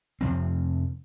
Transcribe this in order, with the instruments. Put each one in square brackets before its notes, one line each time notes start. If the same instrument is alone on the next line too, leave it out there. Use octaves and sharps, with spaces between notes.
[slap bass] F2 C3 F3 C4